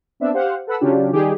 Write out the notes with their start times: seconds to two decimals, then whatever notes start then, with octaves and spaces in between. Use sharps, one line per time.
0.20 B3 C4 D4 E5
0.33 G4 C5 F5 F#5
0.67 A4 B4 F#5 B5 E6
0.80 C#3 F#3 C#4 D4 F4 G4
1.13 D#3 G3 D#4 G4 G#4